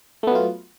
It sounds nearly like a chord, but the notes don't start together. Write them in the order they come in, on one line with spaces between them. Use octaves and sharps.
A3 B3 F#3 F4